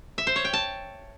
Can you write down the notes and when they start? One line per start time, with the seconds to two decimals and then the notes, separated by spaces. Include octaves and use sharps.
0.18 E5
0.27 C5
0.36 C#5
0.45 G5
0.53 A5